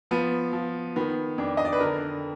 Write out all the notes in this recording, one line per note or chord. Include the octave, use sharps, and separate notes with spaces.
F3 B3
F3
D#3 B3
F2 D4
D#5
D5
B4
D3 A#4